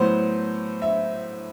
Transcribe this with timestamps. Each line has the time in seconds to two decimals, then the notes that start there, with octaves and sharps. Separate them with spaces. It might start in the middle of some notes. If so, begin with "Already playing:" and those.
Already playing: A2 F#3 B3 C5
0.82 E5